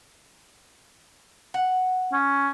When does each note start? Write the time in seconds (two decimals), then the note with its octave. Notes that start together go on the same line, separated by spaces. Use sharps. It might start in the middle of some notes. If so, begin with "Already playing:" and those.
1.54 F#5
2.13 C#4